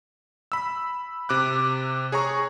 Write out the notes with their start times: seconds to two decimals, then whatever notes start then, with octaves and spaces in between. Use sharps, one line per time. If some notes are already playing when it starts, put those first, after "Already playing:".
0.52 B5 E6
1.29 C3 D6 F#6
2.12 G#4 C#5 G#5 A#5 C#6